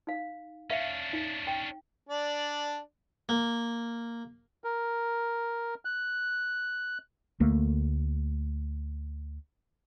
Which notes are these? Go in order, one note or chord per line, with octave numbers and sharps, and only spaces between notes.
D#4 F5
C#4 D4 E5 F5
D#4
G5
D4 D5
A#3
A#4
F#6
D2 A3 A#3